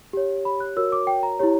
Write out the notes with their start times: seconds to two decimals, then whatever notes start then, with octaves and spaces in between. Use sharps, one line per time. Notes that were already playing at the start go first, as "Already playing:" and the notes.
0.13 G4 C#5
0.45 B5
0.60 F#6
0.77 F#4 A#4 C#5 E6
0.92 D6
1.07 G5
1.23 A#5
1.39 E4 G4 C#5